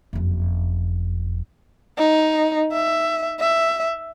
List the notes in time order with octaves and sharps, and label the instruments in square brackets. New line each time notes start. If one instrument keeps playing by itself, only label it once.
[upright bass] F#1 F2
[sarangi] D#4
E5
E5